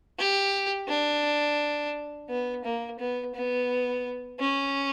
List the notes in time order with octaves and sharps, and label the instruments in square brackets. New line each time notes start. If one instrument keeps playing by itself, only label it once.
[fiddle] G4
D4
B3
A#3
B3
B3
C#4